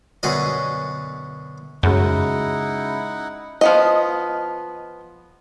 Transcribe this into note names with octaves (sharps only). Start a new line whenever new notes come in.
F#2 B2 D3 G#4 A#4 D#5
F#2 C#3 G#3 D#4 E4 F#4 F#5
F3 B3 D#5